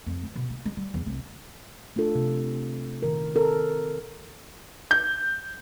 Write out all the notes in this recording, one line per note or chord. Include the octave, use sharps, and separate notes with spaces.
F2
E3
B2
A#3
G#3
G3
E2
C2
A3 D4 F4 A4
C3
A#2 D#3 A#4
C4 A4 A#4
G6